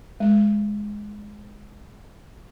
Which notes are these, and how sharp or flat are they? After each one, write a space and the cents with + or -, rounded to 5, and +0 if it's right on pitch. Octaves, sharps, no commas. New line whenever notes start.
G#3 +0